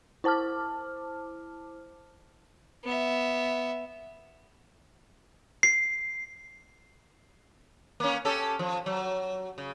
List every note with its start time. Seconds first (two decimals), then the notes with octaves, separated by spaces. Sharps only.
0.24 E4 C5 A5 D6 F6
2.84 B3 E5
5.63 C7
8.00 A#3 C#4
8.25 C#4 G4 A4
8.59 F3
8.86 F#3
9.58 C#3